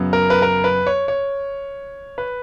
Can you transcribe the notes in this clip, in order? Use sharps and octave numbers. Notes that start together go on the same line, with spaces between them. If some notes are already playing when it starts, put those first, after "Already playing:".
Already playing: F#2 C#3 F#3 B3
A#4
B4
A#4
B4
C#5
C#5
B4